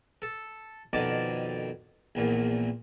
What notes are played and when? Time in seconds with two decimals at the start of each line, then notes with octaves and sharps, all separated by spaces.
0.22 A4
0.93 F2 B2 D#3 D5 A5 D6
2.15 A#1 E2 A#2